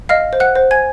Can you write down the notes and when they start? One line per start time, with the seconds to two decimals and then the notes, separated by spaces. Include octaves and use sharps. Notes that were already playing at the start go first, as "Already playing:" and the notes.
0.09 D#5 F5 F6
0.33 C5
0.40 F#5 F#6
0.55 C5
0.71 G#5 G#6